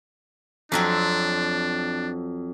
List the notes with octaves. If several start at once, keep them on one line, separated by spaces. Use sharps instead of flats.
F2 F#3 C4 D4